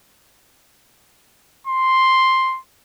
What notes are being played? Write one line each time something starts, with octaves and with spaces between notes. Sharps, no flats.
C6